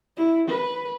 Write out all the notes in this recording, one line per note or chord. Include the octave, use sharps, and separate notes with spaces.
E4
B4